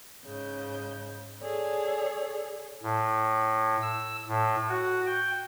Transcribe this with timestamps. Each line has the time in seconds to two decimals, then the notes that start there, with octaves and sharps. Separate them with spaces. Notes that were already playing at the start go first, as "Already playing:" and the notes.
0.25 G#2 C#3 G6
1.40 G#4 A4 C#5 D5
2.83 A2
3.82 E6
4.28 A2
4.69 F#4
5.06 G5